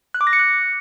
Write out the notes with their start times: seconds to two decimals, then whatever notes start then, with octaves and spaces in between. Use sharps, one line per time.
0.14 F#6
0.21 D6
0.27 A#6
0.33 C#7
0.39 F#6